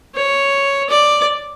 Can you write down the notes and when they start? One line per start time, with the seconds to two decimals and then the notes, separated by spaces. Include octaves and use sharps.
0.15 C#5
0.90 D5